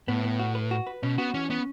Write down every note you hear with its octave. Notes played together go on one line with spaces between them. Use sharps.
A2 B3
B3
F#4
B4
F#4
B4
B2 C#4
B3 F#4
E3 C#4
B3 C#4